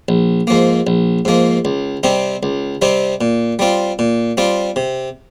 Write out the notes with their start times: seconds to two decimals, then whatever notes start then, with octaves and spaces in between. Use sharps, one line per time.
0.09 A#1
0.47 G#2 F3 A#3
0.87 A#1
1.25 G#2 F3 A#3
1.65 C#2
2.03 C3 G3 C4 D#4
2.43 C#2
2.82 C3 G3 C4 D#4
3.21 A#2
3.59 G3 C4 F4
3.99 A#2
4.37 G3 C4 F4
4.76 C3